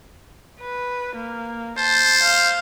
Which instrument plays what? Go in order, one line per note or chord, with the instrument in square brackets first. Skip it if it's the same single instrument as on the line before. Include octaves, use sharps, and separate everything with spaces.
[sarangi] B4
A#3
[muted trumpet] C5 [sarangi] A5
[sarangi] F5